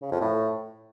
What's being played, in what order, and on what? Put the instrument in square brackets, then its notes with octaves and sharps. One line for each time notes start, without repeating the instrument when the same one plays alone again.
[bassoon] C#3
F2
A2